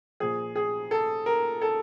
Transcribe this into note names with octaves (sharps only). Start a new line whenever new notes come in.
A#2 F3 G#4
G#4
A4
A#4
A4